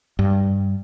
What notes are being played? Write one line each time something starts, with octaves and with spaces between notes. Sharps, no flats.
G2